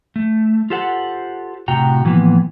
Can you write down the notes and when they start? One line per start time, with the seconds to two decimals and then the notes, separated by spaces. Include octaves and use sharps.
0.16 A3
0.70 F4 G4 A4 C5 F#5
1.68 A2 C3 F#4 G5 A#5
2.05 A2 E3 F3 A#3 B3